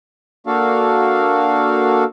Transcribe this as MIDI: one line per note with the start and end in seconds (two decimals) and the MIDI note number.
0.47 2.04 58
0.47 2.04 62
0.47 2.04 66
0.47 2.04 69
0.47 2.04 77